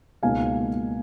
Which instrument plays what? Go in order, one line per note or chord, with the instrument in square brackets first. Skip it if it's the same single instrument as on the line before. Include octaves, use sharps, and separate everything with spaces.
[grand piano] C#2 B2 A#3 D#4 F5 G#5